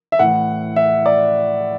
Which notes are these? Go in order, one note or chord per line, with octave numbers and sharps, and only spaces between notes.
E5
A2 E3 F#5
E5
D5